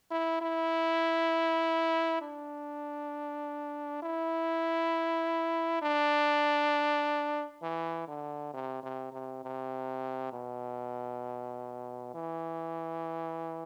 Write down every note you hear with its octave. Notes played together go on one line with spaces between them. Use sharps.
E4
E4
D4
E4
D4
E3
D3
C3
C3
C3
C3
B2
E3